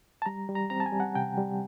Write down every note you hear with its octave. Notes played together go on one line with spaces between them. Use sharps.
A5
G3 A#5
G3
A#5
C4 A#5
A5
G#5
G3
F#5
C3 G5
G3